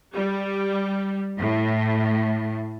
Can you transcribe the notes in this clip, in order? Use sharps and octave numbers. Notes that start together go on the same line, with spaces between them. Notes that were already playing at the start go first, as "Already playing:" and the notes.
G3
A2